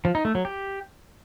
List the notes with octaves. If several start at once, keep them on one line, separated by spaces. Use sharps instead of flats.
F3
D#4
A3
F#3
G4